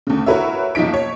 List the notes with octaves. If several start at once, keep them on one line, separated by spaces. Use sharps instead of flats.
D2 C#3
E4 F#4 A#4 B4 C#5 E5
F#1 B1 F3 D#4 B6 D7
C#5